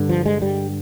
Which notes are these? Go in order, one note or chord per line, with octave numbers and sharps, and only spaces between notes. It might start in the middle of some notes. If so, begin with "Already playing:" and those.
Already playing: G2 D3
F3
G#3
G3